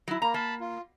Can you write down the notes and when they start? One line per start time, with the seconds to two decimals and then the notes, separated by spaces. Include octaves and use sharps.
0.08 F#3 E4
0.22 A#3 A#5
0.34 A#3 A5 B5
0.61 F4